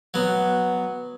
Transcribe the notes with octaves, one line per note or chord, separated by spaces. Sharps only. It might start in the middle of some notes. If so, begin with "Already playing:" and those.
F#3 B3